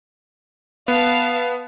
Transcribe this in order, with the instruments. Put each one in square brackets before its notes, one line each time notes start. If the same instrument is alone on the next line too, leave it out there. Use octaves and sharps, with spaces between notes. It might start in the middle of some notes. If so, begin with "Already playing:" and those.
[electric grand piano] B3 [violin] F5 A5